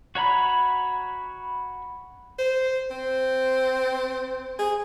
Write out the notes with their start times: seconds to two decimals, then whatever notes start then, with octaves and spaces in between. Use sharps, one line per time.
0.15 F#4 C#5 A#5 B5
2.39 C5
2.91 C4
4.59 G#4